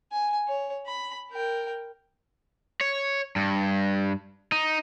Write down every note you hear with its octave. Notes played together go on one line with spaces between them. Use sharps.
G#5
C#5
B5
A#4 G5
C#5
G2
D#4